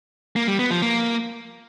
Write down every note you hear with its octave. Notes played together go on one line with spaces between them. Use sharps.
A#3
G3
B3
F3
A#3